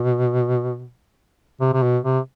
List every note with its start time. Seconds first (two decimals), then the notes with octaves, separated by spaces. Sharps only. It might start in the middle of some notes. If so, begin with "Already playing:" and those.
Already playing: B2
1.61 C3
1.74 C3
1.83 B2
2.04 C3